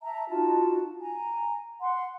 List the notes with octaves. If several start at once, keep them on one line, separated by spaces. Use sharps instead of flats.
E5 A5 A#5
D#4 F4 F#4 A5
G#5 A#5
F#5 C6